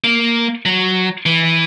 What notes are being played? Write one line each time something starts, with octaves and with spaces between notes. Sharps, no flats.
A#3
F#3
E3